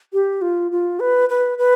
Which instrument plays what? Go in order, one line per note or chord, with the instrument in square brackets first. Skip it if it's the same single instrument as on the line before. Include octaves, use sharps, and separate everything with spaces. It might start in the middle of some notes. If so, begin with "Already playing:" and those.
[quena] G4
F4
F4
B4
B4
B4